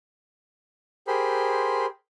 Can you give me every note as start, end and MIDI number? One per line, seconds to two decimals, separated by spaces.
1.07 1.86 67
1.07 1.86 68
1.07 1.86 70
1.07 1.86 72
1.07 1.86 83
1.07 1.86 84